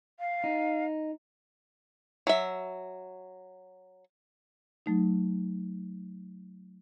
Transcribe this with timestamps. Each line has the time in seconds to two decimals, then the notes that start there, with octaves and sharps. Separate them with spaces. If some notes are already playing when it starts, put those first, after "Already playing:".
0.20 F5
0.44 D#4
2.27 F#3 E5
4.86 F#3 A3 D#4